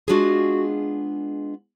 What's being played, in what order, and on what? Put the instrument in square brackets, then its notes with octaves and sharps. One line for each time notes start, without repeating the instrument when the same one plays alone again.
[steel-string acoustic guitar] G#3 B3 D4 F4 G#4 [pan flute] F#4